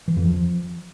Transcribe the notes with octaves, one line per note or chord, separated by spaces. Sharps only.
E3
F2
F3